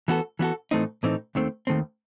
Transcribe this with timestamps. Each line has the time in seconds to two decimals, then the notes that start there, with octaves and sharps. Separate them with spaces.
0.08 E3 B3 F#4 A4
0.39 E3 B3 F#4 A4
0.71 A2 E3 A3 C4 D#4
1.03 A2 E3 A3 C4 D#4
1.35 D#2 D#3 A3 C4
1.67 D#2 D#3 A3 C4